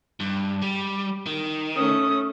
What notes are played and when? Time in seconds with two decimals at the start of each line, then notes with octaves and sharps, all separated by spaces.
0.20 G2
0.62 G3
1.26 D#3
1.76 A3 C#4 D#6